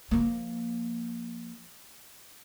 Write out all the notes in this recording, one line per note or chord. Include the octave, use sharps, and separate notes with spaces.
F3 A#3